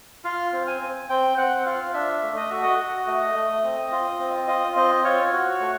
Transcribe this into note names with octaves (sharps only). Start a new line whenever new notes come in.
F4 F5
C4
G#5
C4
C4 G5
C4 F#5
F4 F5
D4 E5
A3
D#5
F#4 E5
D#5
F#4
A3
A3
C4
F4
C4
F4 D#5
C4 D#5
F4 C#5
F#4
A3